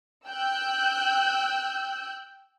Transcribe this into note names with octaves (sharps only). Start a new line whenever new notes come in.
G5 E6 F#6 G6